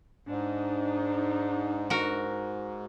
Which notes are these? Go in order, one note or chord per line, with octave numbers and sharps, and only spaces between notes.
G#2 D4 D#4
F#4 A#4